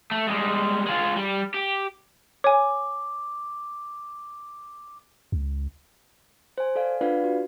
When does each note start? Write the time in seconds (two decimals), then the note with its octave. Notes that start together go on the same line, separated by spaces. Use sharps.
0.11 A3
0.29 G3 G#3
0.87 G#3 F4
1.16 G3
1.54 G4
2.44 C#5 G#5 D6
5.32 C#2
6.58 C5 G#5
6.76 A4 D5 F5
7.01 D4 F4 B4 D5 F5 F#5
7.24 F#4